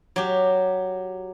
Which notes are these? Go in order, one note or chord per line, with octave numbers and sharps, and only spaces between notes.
F#3 G4